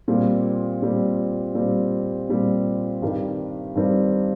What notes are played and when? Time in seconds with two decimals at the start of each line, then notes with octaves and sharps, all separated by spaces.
0.08 A#2 G3 C4
0.82 A#2 G3 C4
1.55 A#2 G3 C4
2.29 A#2 G3 C4
3.02 G2 D#3 G3 C4
3.75 G2 D#3 G3 C4